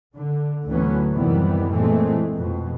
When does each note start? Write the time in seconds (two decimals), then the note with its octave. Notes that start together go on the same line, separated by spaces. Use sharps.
0.16 D3
0.67 D2 A2 E3 F#3 B3 C#4
1.13 F#2 C3 D#3 E3 G3 B3
1.72 A#2 E3 G#3 A3 C4
2.34 F2 B2